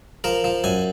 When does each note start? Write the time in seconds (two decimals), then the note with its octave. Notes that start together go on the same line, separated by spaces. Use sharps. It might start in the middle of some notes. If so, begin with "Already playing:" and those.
0.24 F3 A#4
0.44 F3
0.64 F#2 G#5